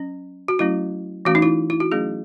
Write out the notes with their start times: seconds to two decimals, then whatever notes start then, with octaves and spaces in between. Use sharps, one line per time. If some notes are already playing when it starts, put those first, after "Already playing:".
Already playing: F#3 C#4
0.48 F#4
0.59 F#3 A3 C#4 E4
1.25 E3 A3 C#4 F#4
1.35 D#4
1.42 E4
1.70 E4
1.80 F#4
1.92 F#3 A3 C#4 G#4